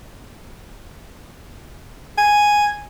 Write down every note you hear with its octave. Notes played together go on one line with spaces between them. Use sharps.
G#5